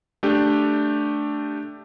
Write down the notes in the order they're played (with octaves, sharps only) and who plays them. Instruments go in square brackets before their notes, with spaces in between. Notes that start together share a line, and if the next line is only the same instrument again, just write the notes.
[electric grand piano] A3 D4 G4